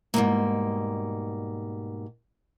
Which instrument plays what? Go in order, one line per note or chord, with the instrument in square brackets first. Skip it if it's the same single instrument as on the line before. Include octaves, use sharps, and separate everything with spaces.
[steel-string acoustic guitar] G#2 B2 F3 G3 G#3 A#3